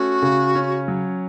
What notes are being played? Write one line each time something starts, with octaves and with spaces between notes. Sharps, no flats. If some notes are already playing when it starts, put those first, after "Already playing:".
Already playing: A3 C#4 F#4
C#3
C#4
F#3